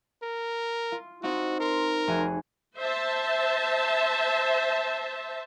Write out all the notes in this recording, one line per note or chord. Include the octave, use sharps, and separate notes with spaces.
A#4
F4
C4 D#4 F4 F#4
A#4 C6
F1 F#4 G#4
C5 E5 A5